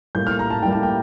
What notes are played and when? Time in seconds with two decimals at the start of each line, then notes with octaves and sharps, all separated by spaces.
0.15 A2 G3 A#3 G6
0.27 F6
0.39 A#5
0.50 A5
0.63 A2 G3 A#3 G5
0.72 A5
0.83 G5